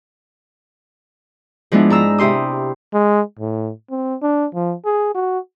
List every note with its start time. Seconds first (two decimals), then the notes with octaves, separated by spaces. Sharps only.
1.72 F3 G#3 B3 D4 E4
1.90 G#2 A#5 E6
2.18 C3 E4 G4 C6 D#6
2.93 G#3
3.39 A2
3.90 C4
4.22 D4
4.54 F3
4.85 G#4
5.14 F#4